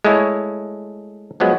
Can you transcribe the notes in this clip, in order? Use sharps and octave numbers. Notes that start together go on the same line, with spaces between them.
G#3 A3 E4 C#5
F3 F#3 G#3 B3